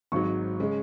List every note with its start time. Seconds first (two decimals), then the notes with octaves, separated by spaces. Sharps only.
0.12 G#1 G#2 F#3 C#6
0.60 C#3 G#3 C#4